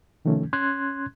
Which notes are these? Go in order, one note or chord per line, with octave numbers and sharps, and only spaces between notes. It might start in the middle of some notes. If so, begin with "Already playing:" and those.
C3 D#3 F3 A3 C#4
C#4 C6 F#6 G#6